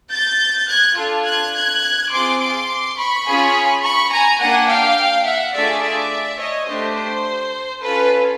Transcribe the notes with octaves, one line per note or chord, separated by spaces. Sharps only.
G6 A6
F#6 G#6
D4 F4 A4
F#6 G#6
F#6 G#6
C4 F4 G#4 C6 D6
C6 D6
B5 C#6
C#4 F4 G#4
B5 C#6
G#5 A#5
A#3 D4 G4 F#5 G#5
F5 G5
E5 F#5
A3 D4 F4 G#4 D5 E5
D5 E5
C#5 D#5
A3 D4 G4 C5
C5
C#4 F4 A4 B4